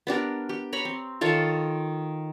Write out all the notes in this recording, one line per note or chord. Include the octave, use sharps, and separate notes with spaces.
B3 D4 G4 A#4
G4
C#5 A#5 B5
C4
D#3 F4 A4 C#5